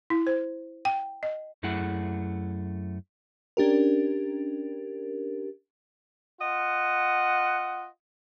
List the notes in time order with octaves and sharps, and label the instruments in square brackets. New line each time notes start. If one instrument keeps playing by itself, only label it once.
[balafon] E4
C5
G5
D#5
[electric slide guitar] F#2 A3 E4 G#4 F#5
[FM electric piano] C#4 D4 G4 A#4
[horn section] F4 D#5 F#5